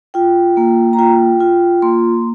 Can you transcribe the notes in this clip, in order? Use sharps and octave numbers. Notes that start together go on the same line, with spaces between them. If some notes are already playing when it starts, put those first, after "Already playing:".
F4 G5
A#3
A#5
F4 G5
F4
A#3 C6